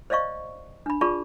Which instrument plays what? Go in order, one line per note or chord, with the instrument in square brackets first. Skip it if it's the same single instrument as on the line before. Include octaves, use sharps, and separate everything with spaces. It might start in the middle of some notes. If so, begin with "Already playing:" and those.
[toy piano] C5 D5 D#5 F5 C#6
D4 B5
F4 G#4 D5 A5 B5 C#6